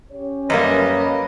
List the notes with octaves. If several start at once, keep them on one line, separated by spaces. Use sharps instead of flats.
C#4 G4 C#5
F#2 G3 A#3 B4 D#5